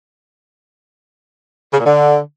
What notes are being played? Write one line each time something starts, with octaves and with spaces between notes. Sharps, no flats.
C#3
A#2
D3